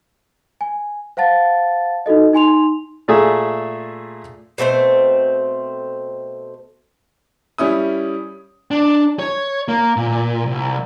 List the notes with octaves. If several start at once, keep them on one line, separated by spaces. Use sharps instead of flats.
G#5
C5 F5 F#5 A5 A6
D#4 F#4 A4 D#5
D#4 G#5 C6 F7
A#2 A3 G#4 E5
B2 A3 C4 C5
G3 C#4 E4 D#6
D4
C#5
A#3
A#2
C2